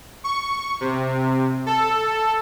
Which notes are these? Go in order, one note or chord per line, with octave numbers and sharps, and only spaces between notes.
C#6
C3
A4